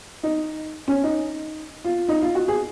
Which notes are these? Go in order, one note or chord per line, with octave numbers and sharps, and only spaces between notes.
D#4
C#4
D#4
F4
D#4
F4
F#4
G#4